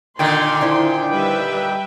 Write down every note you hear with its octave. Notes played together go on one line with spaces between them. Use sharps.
A#2 D3 D#3 G5 C6
F3 D4 E4
G3 B4 E5